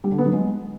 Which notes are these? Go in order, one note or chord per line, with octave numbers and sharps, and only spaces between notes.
G3
D3
B3
F#3
G#3